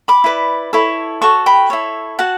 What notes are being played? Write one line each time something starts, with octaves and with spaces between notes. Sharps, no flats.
B5 D6
E4 B4 D5
E4 A4 C#5
F#4 A4 C#5 A5 C#6
G5 B5
E4 A4 C#5
F#4 F#5 A5